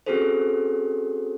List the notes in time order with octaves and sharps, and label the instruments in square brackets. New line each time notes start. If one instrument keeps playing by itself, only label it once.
[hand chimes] C4 C#4 F#4 G#4 A4 C5